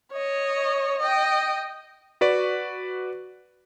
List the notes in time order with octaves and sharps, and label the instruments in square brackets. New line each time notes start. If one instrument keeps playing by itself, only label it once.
[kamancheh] C#5 D#5
D#5 G5
[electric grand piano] F#4 B4 D5